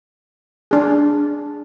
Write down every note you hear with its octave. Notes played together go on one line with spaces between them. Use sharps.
D4 G#4